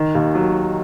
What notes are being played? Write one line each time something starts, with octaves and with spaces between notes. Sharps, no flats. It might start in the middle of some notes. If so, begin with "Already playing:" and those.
Already playing: D#3
D#2
F#3